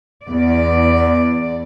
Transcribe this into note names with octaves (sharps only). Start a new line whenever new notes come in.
E2 D5